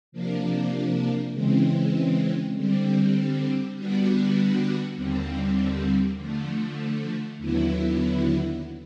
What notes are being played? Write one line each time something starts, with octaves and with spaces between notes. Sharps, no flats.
C3 F3 A#3 D4
C#3 E3 G#3 C4
D3 G3 C4
D3 G3 B3 D4 F#4
D#2 D3 G3 C4
D3 F3 A3
D#2 D3 F#3 B3 E4